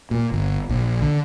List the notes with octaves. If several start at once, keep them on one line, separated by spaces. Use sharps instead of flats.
A#2
G1
A#1
D3